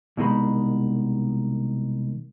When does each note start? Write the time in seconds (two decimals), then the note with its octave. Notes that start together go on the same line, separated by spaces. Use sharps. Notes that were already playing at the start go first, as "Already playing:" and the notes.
0.17 C2 B2 D#3 G#3 B5